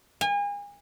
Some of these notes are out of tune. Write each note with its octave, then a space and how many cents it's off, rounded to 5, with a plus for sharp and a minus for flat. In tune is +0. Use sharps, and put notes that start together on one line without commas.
G#5 -35